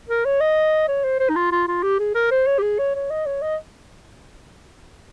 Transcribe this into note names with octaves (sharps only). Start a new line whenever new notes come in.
A#4
C#5
D#5
C#5
C5
C5
D#4
F4
F4
F4
G4
G#4
A#4
C5
C#5
G4
G#4
C#5
C#5
D#5
C#5
D#5